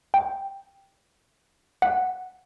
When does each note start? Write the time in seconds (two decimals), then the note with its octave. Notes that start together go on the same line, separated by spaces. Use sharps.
0.14 G5
1.82 F#5